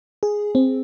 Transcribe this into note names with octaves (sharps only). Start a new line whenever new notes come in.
G#4
C4